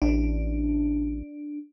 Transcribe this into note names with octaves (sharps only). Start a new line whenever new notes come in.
A1 D4